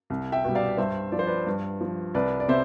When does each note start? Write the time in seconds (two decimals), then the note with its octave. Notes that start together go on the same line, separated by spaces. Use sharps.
0.10 C2
0.32 E5 G5
0.44 B2 G3
0.55 D5 F5
0.78 G2 C5 E5
1.12 F3 D5
1.19 C5
1.27 B4 D5
1.47 G2
1.81 F3
2.14 C2 B4 D5
2.40 D5
2.48 C3 C5 E5